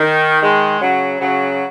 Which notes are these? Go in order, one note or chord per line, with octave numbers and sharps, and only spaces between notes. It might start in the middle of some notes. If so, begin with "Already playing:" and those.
Already playing: D#3
D#3 G#3
C#3 F#3
C#3 F#3